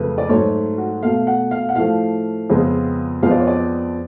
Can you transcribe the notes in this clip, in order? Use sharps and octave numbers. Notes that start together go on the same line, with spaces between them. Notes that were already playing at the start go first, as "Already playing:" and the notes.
Already playing: F2 C#3 F#3 A3 B4
D5
G#2 F#3 A3 C#5
F#4
B2 A3 F5
F#5
F5
F#5
A2 F3 A3 F5
F2 C#3 G#3 B3
F2 F3 G#3 B3 F5
D5
C#5
D5